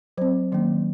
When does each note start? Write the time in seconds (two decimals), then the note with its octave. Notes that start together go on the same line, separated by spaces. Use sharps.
0.18 F#3 C4 C5
0.52 D#3 F#3 A#3 C#4